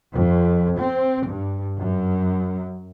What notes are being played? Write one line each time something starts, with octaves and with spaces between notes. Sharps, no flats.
F2
C4
G2
F#2